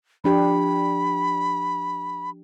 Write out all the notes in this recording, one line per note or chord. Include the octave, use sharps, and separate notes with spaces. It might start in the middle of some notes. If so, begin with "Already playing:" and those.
F3 D4 G4 B5